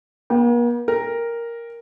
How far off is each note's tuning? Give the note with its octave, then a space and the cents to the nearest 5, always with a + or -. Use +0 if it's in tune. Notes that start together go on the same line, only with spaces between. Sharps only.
A#3 +45 G5 +0
A#4 +0 G5 +35